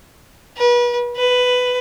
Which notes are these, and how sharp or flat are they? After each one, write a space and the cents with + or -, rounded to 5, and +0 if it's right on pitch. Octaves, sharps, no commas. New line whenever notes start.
B4 -35
B4 +10